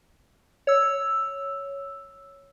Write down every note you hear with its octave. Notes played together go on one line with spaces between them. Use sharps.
C#5 E6